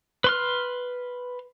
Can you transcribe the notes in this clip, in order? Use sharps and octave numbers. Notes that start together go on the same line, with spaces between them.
B4 C6 F6